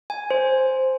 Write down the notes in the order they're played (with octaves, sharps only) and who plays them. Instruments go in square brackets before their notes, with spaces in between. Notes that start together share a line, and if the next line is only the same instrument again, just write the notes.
[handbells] G#5
C5